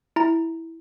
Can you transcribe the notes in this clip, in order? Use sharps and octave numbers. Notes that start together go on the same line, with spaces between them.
E4 A#5